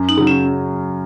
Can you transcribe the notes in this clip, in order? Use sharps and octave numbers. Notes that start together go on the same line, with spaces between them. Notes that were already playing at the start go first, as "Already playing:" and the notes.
Already playing: F#2
D#4
C#3 F#3
C#4